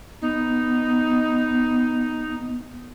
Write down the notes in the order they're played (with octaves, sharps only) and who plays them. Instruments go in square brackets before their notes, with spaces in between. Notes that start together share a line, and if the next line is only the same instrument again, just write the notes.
[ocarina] B3 [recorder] D#4